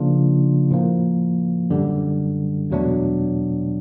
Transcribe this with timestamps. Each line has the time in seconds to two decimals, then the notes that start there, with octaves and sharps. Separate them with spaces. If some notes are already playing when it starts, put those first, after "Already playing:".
Already playing: C#3 F3 A#3 D4 F4
0.71 A2 F3 A#3
1.70 F#2 D3 G3
2.70 E2 B2 F#3 A3 D4